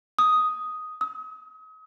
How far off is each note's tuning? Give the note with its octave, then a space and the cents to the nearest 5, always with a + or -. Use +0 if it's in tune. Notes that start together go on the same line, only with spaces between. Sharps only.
D#6 +5
D#6 +40